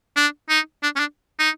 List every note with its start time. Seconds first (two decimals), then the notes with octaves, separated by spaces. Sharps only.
0.16 D4
0.49 D#4
0.83 D4
0.96 C#4
0.99 D4
1.40 D#4